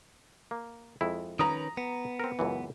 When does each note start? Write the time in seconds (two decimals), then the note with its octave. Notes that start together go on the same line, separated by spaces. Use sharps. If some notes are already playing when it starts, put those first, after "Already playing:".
0.51 A#3
1.01 F2 G#3 E4
1.39 D#3 C#4 B4 A#5 D#6
1.77 B3
2.19 C4 A#4
2.39 C#2 F#2 E3